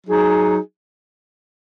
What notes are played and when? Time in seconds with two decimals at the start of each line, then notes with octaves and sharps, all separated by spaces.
0.06 F#3 D#4 G#4